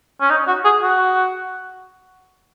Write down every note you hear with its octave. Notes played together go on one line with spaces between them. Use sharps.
C#4
D#4
F#4
G#4
F#4